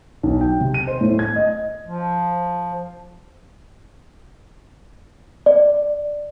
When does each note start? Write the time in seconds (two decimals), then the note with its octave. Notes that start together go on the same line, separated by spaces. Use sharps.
0.23 B1
0.41 G5
0.61 C3
0.74 D#7
0.87 C5
1.01 A2
1.19 G#6
1.36 D#5
1.86 F3
5.46 D5